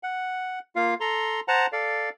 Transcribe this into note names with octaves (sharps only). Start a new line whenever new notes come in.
F#5
A#3 F4 F5
A4 A#5 C6
C5 F#5 A5 A#5
A4 D5 F5